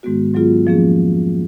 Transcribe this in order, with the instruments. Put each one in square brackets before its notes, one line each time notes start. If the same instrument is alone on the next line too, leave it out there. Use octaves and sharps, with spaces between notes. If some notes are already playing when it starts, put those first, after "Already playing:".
[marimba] G#2 D#3 G#3 B3 F#4
G#2 F#3 B3 F4 G#4
F2 F3 A#3 C#4 G#4